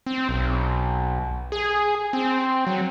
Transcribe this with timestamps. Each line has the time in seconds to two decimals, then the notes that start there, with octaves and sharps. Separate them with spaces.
0.07 C4
0.29 B1
1.52 G#4
2.13 C4
2.67 F#3